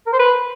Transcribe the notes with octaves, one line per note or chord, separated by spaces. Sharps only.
A#4
C5
B4